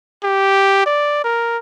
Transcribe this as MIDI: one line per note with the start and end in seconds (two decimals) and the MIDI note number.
0.23 0.82 67
0.86 1.20 74
1.24 1.58 70